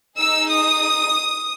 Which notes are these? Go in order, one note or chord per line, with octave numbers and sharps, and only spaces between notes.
D#4 G#4 E6
D#6